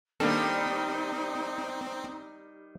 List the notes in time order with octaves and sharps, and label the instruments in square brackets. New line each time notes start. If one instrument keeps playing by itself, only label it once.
[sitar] D#3 G3 [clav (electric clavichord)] A#3 D4 A4 [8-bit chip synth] C4 [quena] D#4